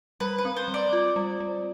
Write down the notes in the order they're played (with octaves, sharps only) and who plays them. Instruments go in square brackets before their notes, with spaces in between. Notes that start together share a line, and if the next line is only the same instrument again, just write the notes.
[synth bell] G3 [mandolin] B4
[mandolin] B4
[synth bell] C4
[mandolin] C5
[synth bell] G3
[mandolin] D5
[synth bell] F4
G3
G3